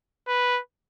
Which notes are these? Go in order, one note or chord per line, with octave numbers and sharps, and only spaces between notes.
B4